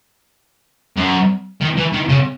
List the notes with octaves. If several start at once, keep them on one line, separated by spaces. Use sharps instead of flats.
F#2
D#3
E3
D#3
C#3